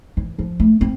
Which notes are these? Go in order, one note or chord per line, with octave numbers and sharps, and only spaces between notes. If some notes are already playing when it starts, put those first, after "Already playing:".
E3
F3
A3
C4